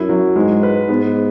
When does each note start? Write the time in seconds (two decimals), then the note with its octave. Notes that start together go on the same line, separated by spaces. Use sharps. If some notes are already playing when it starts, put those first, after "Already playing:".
Already playing: F#2 E4
0.09 F#3
0.36 G#2 G#3
0.63 B4
0.89 G#2 B3